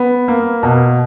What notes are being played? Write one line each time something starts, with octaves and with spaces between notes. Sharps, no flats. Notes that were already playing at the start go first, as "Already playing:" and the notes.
Already playing: B3
A#3
B2